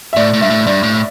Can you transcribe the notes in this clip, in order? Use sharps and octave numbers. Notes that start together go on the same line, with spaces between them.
E5
A2 D5
A2
G2 E5
A2
G2 D5
A2